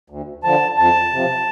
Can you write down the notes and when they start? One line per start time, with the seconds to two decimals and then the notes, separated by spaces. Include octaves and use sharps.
0.10 D2
0.44 D3 F3 A5
0.78 F2 A5
1.12 C3 F3